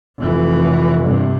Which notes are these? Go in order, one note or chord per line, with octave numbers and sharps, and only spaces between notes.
F1 E3
G2 C3